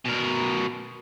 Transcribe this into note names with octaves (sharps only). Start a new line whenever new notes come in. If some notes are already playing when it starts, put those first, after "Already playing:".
B2 A#4